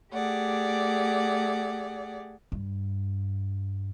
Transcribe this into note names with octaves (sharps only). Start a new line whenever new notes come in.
A3 G4 G#4 D5 F#5
G2